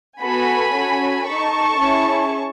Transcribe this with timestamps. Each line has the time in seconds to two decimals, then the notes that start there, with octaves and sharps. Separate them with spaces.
0.20 B3 F#4 A4 G#5 B5
0.73 C#4 F#4 A4
1.27 D#4 A4 A5 C#6
1.79 C#4 E4 G#4